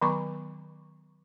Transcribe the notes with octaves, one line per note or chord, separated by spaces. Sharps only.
D#3 F#3 B3 A#5 B5 C#6